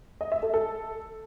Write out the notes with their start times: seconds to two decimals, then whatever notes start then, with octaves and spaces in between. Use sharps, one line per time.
0.21 D#5
0.32 E5
0.43 A4
0.54 A4